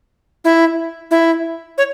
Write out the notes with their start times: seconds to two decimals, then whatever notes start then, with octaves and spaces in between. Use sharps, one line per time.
0.45 E4
1.11 E4
1.78 C#5